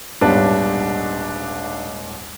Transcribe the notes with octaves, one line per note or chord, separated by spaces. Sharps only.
D#1 B1 G#2 D4 B4 C#5 A5